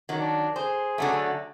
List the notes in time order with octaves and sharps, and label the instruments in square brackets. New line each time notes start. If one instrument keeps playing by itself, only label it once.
[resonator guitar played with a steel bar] D#3 F#3
[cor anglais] D4
[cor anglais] G#4 [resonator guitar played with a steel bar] C5
[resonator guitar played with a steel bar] D3 F#3 A3